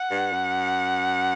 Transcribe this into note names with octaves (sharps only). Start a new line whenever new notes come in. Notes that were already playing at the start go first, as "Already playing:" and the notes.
Already playing: F#5
G2
F#2